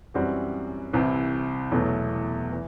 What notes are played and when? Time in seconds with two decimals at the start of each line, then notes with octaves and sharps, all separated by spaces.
0.14 F#2 E3 G3 C4 F#4
0.93 C2 C3 E3
1.72 E2 B2 F#3 A3
2.52 E3